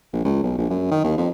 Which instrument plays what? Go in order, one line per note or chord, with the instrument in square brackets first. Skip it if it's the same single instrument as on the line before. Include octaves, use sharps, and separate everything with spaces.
[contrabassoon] A#1
C#2
B1
A#1
F#2
D#3
D#2
F2